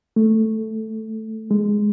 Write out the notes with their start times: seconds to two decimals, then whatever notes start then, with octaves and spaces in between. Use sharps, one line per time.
0.16 A3
1.51 G#3